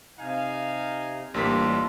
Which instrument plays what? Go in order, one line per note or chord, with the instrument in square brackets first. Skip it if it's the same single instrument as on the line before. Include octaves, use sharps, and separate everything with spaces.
[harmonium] C3 [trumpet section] D#4 F5 G#5
[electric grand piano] A1 A#3 B6 [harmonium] G3 D4 G4 [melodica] F4 A4